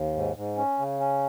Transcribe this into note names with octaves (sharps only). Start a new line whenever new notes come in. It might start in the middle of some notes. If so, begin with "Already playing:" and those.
Already playing: D#2
G#2
G#2
C#4
C#3
C#4